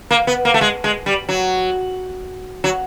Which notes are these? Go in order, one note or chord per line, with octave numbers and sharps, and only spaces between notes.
A#3
B3
A#3
A3
G#3
G#3
G3
F#3
F#3